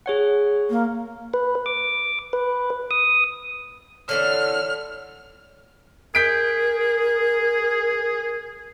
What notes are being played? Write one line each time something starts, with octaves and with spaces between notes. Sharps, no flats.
G#4 C#5 F#5
A#3
B4
D6
B4
D#6
D3 E3 C4 A4 C#5 F6
G#4 A#4 G6 B6 D7